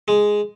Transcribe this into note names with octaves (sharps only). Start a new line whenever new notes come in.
G#3